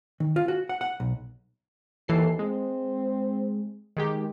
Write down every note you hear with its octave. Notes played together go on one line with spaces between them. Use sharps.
D#3
F4
F#4
F#5
F#5
B1
D#2 E3 A4 C7
G#3 C4
D#3 G#3 G4